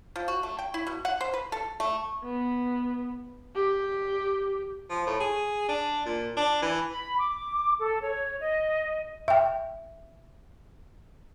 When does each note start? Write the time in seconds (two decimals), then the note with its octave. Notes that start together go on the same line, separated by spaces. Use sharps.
0.16 F3
0.28 F#4
0.43 A3
0.59 G5
0.74 E4
0.87 B2
1.05 F#5
1.21 C5
1.34 B4
1.52 A4
1.80 A3
2.24 B3
3.55 G4
4.90 F3
5.07 A2
5.20 G#4
5.69 D4
6.06 A#2
6.37 D4
6.62 E3
6.91 B5
7.19 D6
7.80 A4
8.01 C#5
8.40 D#5
9.28 E5 G5